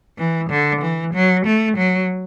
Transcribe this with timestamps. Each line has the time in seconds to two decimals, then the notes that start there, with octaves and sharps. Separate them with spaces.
0.18 E3
0.50 D3
0.82 E3
1.14 F#3
1.46 A3
1.77 F#3